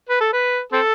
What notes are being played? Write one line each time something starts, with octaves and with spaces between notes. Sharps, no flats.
B4
A4
B4
C4 A4